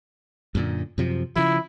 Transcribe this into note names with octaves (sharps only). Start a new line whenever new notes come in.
F#2 A#2 D3
F#2 C3 F3
C#3 F3 E4